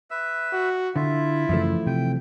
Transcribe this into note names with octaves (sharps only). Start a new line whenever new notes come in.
B4 E5 E6
F#4
D3 E4 F4 E5
F#2 C#3 E3 F3 A3
C3 G5